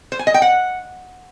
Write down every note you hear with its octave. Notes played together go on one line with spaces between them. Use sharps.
C5
G#5
D#5
G5
F#5